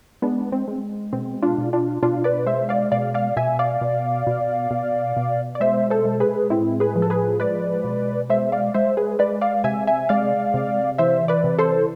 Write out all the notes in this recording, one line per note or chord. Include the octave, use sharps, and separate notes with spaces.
G#3 B3 D4
C4
G#3
B2 C4
D4 F4
B2
D4 F4
B2 D4 F4
B4 D5
G#3 C5 E5
D5 F5
B2 D5 F5
D5 F5
B2 E5 G#5
D5 F5
B2
B2
B2
B2
D5
G#3 C5 E5
A4 C5
G#3
G#4 B4
A2 C4 E4
G#4 B4
F3
A4
G#4 B4
G#3 B4 D5
B2
G#3 C5 E5
D5 F5
G#3 C5 E5
G#4 B4
G#3 B4 D5
D5 F5
C3 E5 G#5
E5 G#5
G#3 D5 F5
C3
E3 C5 E5
B4 D5
C3
A4 C5